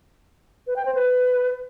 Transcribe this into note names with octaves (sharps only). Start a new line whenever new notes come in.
B4
G5
C5
B4